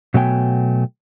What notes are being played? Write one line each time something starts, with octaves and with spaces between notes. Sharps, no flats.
B2 F#3 A3 B3 G5 G#5